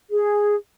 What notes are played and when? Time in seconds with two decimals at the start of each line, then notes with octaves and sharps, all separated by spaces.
0.11 G#4